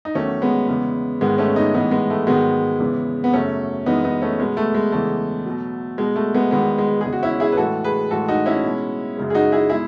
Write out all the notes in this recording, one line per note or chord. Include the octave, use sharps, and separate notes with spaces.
D#4
E2 D#3 F#3 A3 C#4
G#3 B3
E2 C#3 E3 G#3
G#2 D#3 G#3 B3
A3 C#4
B3 D#4
A2 E3 G#3 B3 D#4
G#3 B3
A3
G#2 D#3 F#3 G#3 B3
E2 C#3 E3 G#3
B3
F#2 C#3 F#3 A3 C#4
F#2 E3 G#3 B3 D#4
B3 D#4
A3 C#4
B2 G#3 B3
A3
G#3
E2 C#3 E3 G#3 A3
B2 F#3
B2 G#3
A3
G#3 B3
E2 D#3 F#3 G#3 B3
G#3
E2 C#3 G#3 G#4
F#4
C#4 E4
E4 G#4
B4
A2 E3 G#3 F#4 A4
G#4 B4
A2 E3 G#3 F#4 A4
D#4 F#4
C#4 E4
B2 G#3
F#2 C#3 G#3
G#4
D#4 F#4
E4 G#4
B2 G#3 E4 G#4